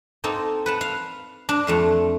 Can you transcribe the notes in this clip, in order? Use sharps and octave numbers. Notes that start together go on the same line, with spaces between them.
A#3 C4 D#4 A4
B4 F#5 A5
F5
D4
F2 A3 F5